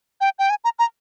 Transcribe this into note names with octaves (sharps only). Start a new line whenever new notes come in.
G5
G5
G#5
A#5
A#5